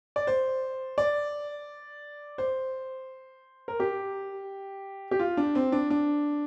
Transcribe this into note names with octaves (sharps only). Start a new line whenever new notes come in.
D5
C5
D5
C5
A#4
G4
G4
F4
D4
C4
D4
D4